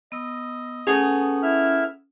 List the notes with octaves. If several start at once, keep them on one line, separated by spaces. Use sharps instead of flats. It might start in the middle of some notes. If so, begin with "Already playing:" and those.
B3 D#5 E6
A3 B3 C#4 G#4
E4 E5 F6